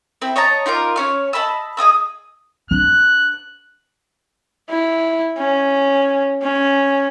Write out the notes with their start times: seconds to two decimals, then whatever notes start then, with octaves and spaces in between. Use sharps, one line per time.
0.22 C4 E4
0.36 C#5 D#5 A5 A#5
0.66 D#4 F4 A#4 D6
0.96 C#4 C#5 F6
1.33 D#5 A5 B5 E6
1.77 G#4 D#5 D#6 E6
2.71 D4 F#6
4.70 E4
5.38 C#4
6.43 C#4